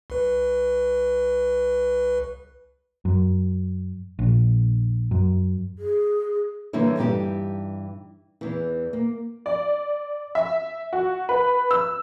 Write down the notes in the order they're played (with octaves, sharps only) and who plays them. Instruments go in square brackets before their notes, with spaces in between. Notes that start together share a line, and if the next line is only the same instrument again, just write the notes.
[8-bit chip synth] C2 B4
[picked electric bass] F#2
A#1
F#2
[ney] G#4
[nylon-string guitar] D3 E3 G3 A#3 E4 C#5
G2 E3 G3 D#4 G4
E2 E3
A#3
[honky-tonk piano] D5
E5
F#4
B4
E6